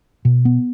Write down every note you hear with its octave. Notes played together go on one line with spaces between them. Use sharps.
B2
B3